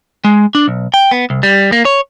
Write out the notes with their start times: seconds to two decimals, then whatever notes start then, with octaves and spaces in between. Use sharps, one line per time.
0.25 G#3
0.55 D4
0.68 B1
0.94 G5
1.11 B3
1.30 C2
1.43 G3
1.72 A#3
1.85 C#5